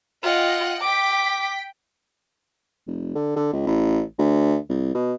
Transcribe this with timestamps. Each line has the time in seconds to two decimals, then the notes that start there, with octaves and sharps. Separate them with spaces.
0.23 F4 D#5 F#5 G5
0.82 G5 D6 B6
2.87 F1
3.15 D3
3.36 D3
3.53 C#2
3.67 A1
4.19 D2
4.69 C2
4.95 B2